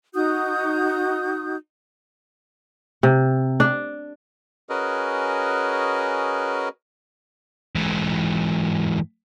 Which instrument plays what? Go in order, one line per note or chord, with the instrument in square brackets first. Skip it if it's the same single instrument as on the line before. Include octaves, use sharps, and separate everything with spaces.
[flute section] D#4 F#4 D#6 G6
[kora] C3
D4
[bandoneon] C#4 F#4 G#4 A#4 B4 D#5
[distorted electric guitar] G#2 E3